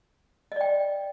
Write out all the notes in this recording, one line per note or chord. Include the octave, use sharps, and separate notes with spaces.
D5 D#5 G5